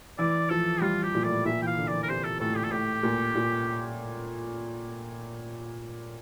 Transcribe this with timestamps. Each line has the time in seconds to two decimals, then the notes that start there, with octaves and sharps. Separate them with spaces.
0.18 E3 D5
0.50 F3 A4
0.81 G3 F4
1.03 F3 G4
1.15 A#2
1.24 A2 D5
1.45 A#2 E5
1.61 E3 G5
1.67 F5
1.77 D3
1.87 E3 D5
2.03 A#4
2.08 C3 C5
2.24 A4
2.40 A2 A4
2.56 G4
2.63 A4
2.71 A2 G4
3.03 A#2
3.35 A#2